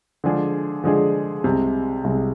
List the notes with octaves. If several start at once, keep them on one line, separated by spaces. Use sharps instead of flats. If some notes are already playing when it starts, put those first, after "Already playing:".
D3 F3 G#3 D4 G#4
D3 F3 G#3 D4 G#4
C2 C3 G#3
C2 C3 G#3